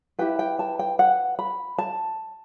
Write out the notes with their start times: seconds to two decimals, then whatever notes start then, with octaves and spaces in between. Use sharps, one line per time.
0.19 E4 G4 B4 G5
0.39 G5
0.59 A5
0.79 G5
0.99 F#5
1.39 B5
1.78 A5